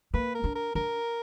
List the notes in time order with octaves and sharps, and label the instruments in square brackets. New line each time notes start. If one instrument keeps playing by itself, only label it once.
[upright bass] A#3 [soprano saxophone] B4
[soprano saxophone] A#4
[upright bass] D4
[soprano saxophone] A#4
[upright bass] D4 [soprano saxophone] A#4